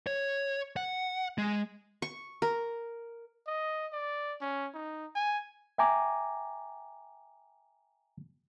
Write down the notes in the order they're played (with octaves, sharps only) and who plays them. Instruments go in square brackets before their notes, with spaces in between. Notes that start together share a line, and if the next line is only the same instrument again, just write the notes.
[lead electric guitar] C#5
F#5
G#3
[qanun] C#6
A#4
[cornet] D#5
D5
C#4
D#4
G#5
[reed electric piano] E5 G5 G#5 A#5 D6